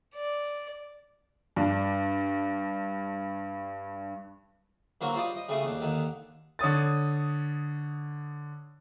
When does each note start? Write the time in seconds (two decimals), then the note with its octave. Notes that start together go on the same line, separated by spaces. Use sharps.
0.15 D5
1.56 G2 D4
5.01 D3 F#3 A#3 C4 F#4 A#4
5.14 G3 F4 C5 D5 D#5
5.36 D#5
5.49 C#3 G3 A3 C6 D#6
5.63 D#2 D4
5.81 D#2 D3 D#3
6.59 D3 C#5 D#6 A6